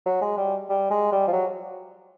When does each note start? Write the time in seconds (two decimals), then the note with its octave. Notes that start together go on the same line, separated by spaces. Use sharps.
0.06 F#3
0.21 G#3
0.38 G3
0.69 G3
0.91 G#3
1.12 G3
1.27 F3
1.33 F#3